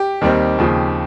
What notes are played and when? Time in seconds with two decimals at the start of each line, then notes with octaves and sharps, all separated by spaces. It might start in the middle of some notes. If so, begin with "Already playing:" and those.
Already playing: G4
0.21 D#2 D#3 G3 C4 D#4
0.58 D#2 C#3 F3